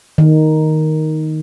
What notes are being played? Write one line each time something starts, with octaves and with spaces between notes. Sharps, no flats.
D#3